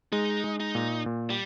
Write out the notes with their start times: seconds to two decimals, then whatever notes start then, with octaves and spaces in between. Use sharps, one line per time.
0.12 G#3 D#4
0.44 G#3
0.60 D#4
0.75 A#2
1.06 A#2
1.30 G3